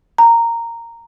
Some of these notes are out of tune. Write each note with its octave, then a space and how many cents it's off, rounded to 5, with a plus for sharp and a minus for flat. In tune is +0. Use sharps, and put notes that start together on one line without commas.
A#5 -10